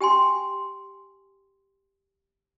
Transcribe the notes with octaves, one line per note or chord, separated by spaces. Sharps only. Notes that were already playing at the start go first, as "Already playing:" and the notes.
G4 G5 G#5 C6